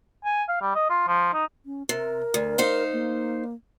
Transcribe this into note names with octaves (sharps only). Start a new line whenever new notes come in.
G#5
F5
G3
D#5
F4
F3
D#4
C#4
C3 A#4
D2
D#4 C5 F5
A#3